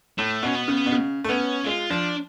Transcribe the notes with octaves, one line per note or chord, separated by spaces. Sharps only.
A2 A3
B2 C#4
B3
C#3
B2
C#3
A3
B3 C#4
G#3 F4
F3 D4